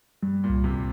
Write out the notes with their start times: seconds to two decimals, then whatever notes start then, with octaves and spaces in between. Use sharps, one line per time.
0.23 G2 G3
0.44 A#2
0.49 C2
0.64 C3